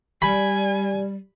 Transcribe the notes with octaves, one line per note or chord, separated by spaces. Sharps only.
G3 G4 D5 G#5 B5